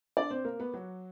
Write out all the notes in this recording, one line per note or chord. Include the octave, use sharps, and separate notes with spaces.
D4 D5
C4 C5
A#3 A#4
B3 B4
F#3 F#4